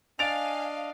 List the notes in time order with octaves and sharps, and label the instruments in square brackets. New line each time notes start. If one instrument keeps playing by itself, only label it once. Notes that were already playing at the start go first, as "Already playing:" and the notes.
[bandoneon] D4 D#5 [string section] F5 [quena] G#5 [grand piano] A6 D7 F7